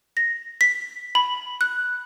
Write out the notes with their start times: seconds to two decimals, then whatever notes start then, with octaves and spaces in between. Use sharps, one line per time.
0.17 A#6
0.61 B6
1.15 B5
1.61 F#6